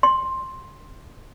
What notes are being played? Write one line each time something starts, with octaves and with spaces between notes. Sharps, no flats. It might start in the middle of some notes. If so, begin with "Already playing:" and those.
C6